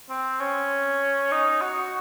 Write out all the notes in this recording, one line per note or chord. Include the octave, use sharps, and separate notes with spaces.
C4
C#4
D#4
F#4